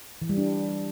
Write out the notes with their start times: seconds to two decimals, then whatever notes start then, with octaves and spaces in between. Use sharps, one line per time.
0.22 E3
0.29 G3
0.37 D4